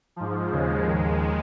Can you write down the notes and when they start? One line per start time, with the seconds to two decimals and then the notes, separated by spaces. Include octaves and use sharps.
0.16 G#2 F3
0.51 D#2 C#3 F3 G#3
0.87 D#2 D#3